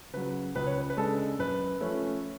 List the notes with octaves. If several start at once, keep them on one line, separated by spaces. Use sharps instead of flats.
C#3 F#3 B4
C#2 B4
C#5
B4
B4
C#3 G#3 D4 A4
F#2 B4
F3 A3 C#4